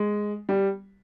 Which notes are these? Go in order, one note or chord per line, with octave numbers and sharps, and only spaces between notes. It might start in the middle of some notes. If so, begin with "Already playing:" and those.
Already playing: G#3
G3